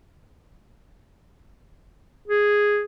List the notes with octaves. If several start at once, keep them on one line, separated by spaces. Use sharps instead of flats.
G#4